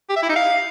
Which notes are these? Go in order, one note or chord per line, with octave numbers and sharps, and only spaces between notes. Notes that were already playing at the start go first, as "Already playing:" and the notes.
G4
E5
E4
D#4
F5